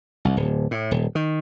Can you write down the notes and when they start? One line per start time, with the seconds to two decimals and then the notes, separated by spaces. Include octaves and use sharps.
0.25 C2
0.37 D1
0.71 A2
0.91 D#1
1.15 D#3